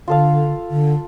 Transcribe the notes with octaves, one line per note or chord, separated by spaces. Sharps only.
D3 F4 A4 F5
D3